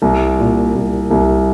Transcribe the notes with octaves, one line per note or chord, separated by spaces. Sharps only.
C2
A#2
C2
C2